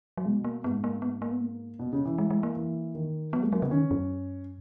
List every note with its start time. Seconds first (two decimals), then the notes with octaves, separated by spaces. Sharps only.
0.17 F#3
0.26 B2 G#3
0.44 A#3
0.64 G#2 B3
0.84 A#3
1.02 B3
1.22 A#3
1.32 B3
1.41 A#3
1.79 B2
1.93 C#3
2.05 E3
2.18 G#3
2.30 G#3
2.43 A#3
2.56 E3
2.95 D#3
3.33 F#3 B3
3.42 G#3 A#3
3.53 F#3 A#3
3.61 C#3 B3
3.71 D#3 C#4
3.91 F#2